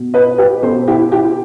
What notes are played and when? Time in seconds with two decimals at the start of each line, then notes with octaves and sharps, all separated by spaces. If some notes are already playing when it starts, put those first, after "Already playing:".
Already playing: B2
0.14 B4 D#5
0.38 G4 B4
0.63 B2 A4 C5
0.88 E4 G4
1.12 E4 G4